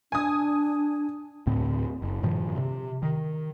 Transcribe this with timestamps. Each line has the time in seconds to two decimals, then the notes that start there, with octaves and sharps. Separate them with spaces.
0.12 D4 G#5 D#6
1.47 D2 A2 C4
2.02 F#1
2.23 G2 A#2 D#3 F3
2.57 C3
3.03 D#3